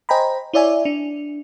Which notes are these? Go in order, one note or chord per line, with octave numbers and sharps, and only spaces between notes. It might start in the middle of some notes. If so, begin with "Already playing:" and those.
C5 D#5 G5 G#5 A#5 B5
E4 C#5 D5 E5 G#5
D4